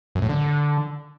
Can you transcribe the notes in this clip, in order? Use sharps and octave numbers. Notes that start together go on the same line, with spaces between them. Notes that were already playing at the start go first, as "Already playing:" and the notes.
F#2
A2
D3